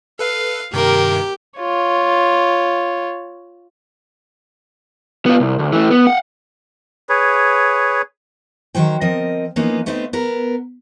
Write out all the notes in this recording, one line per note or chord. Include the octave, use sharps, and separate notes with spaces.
A4 B4 F5
G2 C3 D#3 A#3 G4 A#4
F4 C#5
B3 F4
C2
D2
E3 A3
B3
F5 F#5
G#4 B4 C#5
D#3 F#3 C5 G5
F3 C4 A#4 D#5
E3 F3 A#3 B3 C#4 D#4
A3 B3 C4 D#4 C5
B3 A#4